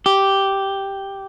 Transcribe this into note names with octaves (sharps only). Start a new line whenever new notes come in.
G4